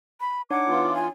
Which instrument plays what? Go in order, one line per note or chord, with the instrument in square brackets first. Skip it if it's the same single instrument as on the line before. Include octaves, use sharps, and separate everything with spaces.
[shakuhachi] B5
[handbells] D4 D#4 C#5 [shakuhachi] F#5 [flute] D6
[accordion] E3 B3 F4
[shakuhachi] G#5